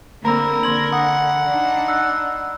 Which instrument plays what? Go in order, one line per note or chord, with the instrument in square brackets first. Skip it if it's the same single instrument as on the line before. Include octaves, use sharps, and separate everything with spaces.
[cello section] D3 A#3 C4 [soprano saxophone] A#4 [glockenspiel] A#5 B5 E6
[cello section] D3 [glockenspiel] C6 G#6 F#7
[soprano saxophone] F#5 [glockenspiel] D#6
[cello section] D4 D#4
[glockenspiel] E6 F#6